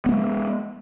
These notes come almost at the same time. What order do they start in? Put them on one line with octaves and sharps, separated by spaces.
B3 A#3 G#3